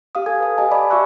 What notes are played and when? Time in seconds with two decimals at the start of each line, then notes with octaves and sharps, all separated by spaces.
0.15 G4 F5 D#6
0.26 A4 G#5 D#6 G#6
0.40 B4 F5
0.57 G4 D#5 G#5 A5
0.71 D5 D#5 B5 D6
0.90 F#4 E5 F5 C#6 E6 F#6